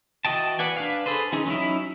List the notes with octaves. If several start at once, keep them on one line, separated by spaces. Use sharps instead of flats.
E3 F#4 D#5 G5 A5
B4 D5 F#5 G#5
D4 B4 F5
G#4 A4 B4 C5
E3 C#4 D#4 G#4
F#3 C#4 D#4 E4